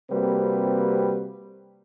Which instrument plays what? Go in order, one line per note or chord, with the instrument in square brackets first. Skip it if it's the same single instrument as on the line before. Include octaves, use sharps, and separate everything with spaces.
[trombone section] C3 G3 A#3 C4 F#4 B4